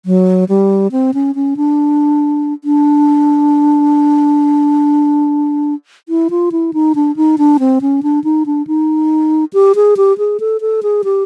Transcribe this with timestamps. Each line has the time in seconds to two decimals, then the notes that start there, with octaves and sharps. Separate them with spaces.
0.06 F#3
0.49 G3
0.92 C4
1.14 C#4
1.35 C#4
1.57 D4
2.64 D4
6.09 E4
6.30 F4
6.52 E4
6.73 D#4
6.95 D4
7.16 D#4
7.38 D4
7.60 C4
7.81 C#4
8.03 D4
8.24 D#4
8.46 D4
8.67 D#4
9.53 G4
9.75 G#4
9.97 G4
10.18 G#4
10.40 A4
10.61 A4
10.83 G#4
11.04 G4